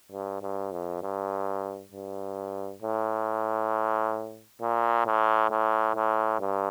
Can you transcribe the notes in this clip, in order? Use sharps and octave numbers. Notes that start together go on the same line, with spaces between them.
G2
G2
F2
G2
G2
A2
A#2
A2
A2
A2
G2